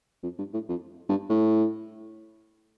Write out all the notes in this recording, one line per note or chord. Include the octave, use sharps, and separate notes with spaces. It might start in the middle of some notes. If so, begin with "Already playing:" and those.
F2
G2
A2
F2
G2
A2